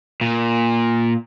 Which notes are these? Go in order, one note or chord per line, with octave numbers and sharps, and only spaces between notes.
A#2